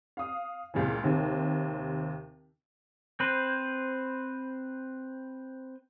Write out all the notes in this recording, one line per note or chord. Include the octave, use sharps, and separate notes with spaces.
F5 D#6
C#2 A#2 E3
D#2 C3
C4 B4 C5